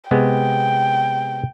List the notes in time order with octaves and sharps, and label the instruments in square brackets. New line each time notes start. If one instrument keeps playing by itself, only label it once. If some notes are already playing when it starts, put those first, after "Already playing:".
[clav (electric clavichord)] C3 G#3 B3 [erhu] G5